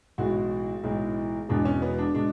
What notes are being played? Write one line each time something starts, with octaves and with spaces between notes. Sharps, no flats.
B1 A2 E3 G#3 F#4
B1 A2 E3 G#3
E1 E2 B2 G#3 D4
C#4
B3
D4
B2 G#3 D4